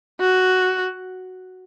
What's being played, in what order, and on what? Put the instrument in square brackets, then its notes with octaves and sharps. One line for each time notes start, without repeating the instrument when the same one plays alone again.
[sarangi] F#4